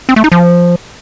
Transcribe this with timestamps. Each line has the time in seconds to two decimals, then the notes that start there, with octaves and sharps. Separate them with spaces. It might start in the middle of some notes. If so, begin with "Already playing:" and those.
0.09 C4
0.16 A3
0.24 D#4
0.32 F3